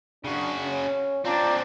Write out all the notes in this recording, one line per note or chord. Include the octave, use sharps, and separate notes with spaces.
C#3 D4 F#4
C#4
C4 D4 F4 D5 A5 A#5